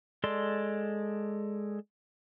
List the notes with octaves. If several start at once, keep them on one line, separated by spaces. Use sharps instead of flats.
G#3 A4 D5 C6